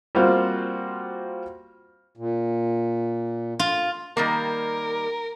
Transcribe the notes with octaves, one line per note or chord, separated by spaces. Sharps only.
G3 A#3 C4 F4 F#4 C5
A#2
F4
D#3 G3 A#3 A#4